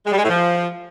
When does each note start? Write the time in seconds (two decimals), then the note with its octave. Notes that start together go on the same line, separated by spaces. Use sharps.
0.06 G#3
0.12 G3
0.17 G#3
0.23 A2
0.28 F3